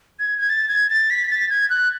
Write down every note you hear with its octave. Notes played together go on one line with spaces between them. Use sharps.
G#6
G#6
A6
G#6
A6
B6
A6
G#6
F#6